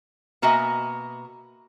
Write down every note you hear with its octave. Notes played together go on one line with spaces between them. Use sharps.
B2 A#3 F#4 D#5 E5 G#5